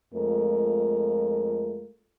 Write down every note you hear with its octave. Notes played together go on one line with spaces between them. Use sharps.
F2 G#3 A3 F4 A#4